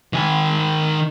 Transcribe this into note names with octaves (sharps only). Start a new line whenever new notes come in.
D#3 G#5